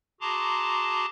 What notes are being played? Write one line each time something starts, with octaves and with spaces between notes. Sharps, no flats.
F#4 G#4 A5 A#5 C6 D6